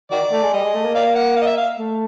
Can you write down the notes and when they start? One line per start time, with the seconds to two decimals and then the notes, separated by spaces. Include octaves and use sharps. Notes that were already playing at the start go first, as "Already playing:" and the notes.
0.11 D#3 F#4 D5
0.32 A3
0.42 G#3
0.53 G3 D#5
0.64 G#3
0.74 A3
0.85 A#3
0.95 D5 F5
1.15 F#5
1.37 F5
1.42 D#5
1.47 E5
1.57 F5
1.79 A3